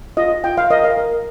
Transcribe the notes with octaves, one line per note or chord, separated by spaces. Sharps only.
F4 D#5
F4 G5
F5
A#4 D#5
F5
A#4